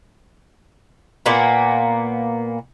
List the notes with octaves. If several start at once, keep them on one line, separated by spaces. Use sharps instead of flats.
A#2 A#3 B3